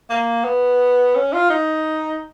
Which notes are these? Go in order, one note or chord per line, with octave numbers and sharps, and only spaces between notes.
A#3
B3
C#4
F4
D#4